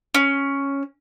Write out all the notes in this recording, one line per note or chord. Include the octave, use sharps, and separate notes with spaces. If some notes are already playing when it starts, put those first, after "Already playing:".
C#4